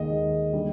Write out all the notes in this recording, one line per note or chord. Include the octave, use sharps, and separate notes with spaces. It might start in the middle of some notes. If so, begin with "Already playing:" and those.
Already playing: D#2 D#3 G#3 D#5
D3 G3